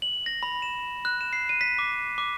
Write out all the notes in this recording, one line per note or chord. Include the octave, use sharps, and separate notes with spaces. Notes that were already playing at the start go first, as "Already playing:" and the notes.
F#7
A#6
B5
E7
F#6
E7
C7
D#7
B6
D6
D6